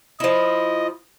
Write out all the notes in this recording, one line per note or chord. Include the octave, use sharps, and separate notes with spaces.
F3 E4 D#5